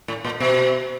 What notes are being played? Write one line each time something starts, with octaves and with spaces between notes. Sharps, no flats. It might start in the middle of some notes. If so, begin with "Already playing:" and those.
A2
A#2
B2